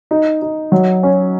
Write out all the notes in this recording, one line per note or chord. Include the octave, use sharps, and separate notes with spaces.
D#4
D#4
F#3
C#4